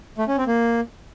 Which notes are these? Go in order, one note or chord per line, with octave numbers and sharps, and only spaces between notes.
A3
C#4
C4
A#3